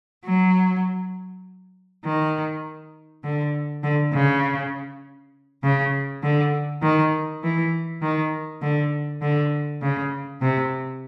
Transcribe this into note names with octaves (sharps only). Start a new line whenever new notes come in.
F#3
D#3
D3
D3
C#3
C#3
D3
D#3
E3
D#3
D3
D3
C#3
C3